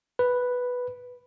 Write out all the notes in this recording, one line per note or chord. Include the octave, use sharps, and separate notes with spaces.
B4